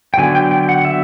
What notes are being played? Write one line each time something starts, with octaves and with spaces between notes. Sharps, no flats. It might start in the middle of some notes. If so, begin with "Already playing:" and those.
G5
D3 F#3 B3 G#5
G5
G5
F#5
E5